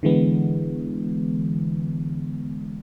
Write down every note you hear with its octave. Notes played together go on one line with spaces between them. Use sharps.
D3 E3 G#3 B3